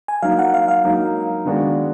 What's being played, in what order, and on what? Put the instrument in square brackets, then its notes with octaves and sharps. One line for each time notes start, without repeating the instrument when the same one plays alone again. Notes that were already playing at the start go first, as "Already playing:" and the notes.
[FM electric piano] G#5
[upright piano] F#3 A#3 D#4 [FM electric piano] F5
[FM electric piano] F#5
F5
F5
[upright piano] F#3 A#3 D#4
D#3 G#3 B3 D4 F#4